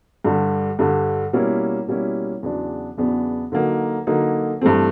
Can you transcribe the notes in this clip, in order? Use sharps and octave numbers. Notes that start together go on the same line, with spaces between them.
G2 D3 G3
G2 D3 G3
B2 G3 A#3 C#4 E4
B2 G3 A#3 C#4 E4
E2 C#3 F#3 B3 D4
E2 C#3 F#3 B3 D4
D3 F#3 A#3 D#4
D3 F#3 A#3 D#4
G2 E3 A3 C4